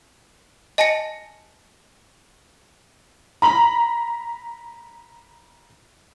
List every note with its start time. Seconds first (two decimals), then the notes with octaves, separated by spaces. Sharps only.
0.78 D#5 G#5 A5 A#6 C#7
3.42 A#5 B5 F#7